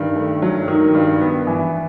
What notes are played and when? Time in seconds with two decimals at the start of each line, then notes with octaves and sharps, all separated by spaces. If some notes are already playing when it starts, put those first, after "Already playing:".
Already playing: G2 D#3
0.16 A3
0.42 F#3
0.68 D#3
0.94 G2
1.21 B3
1.47 E3